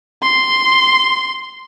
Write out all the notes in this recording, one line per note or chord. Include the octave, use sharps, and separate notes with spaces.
C6